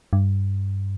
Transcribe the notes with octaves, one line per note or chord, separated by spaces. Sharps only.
G2